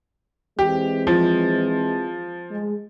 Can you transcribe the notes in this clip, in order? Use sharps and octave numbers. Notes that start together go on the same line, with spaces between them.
E3 G#3 C4 G4
F3
G#3